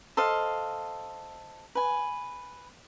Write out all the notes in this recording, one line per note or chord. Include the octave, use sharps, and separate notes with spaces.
A4 C5 D#5 F5
B4 G#5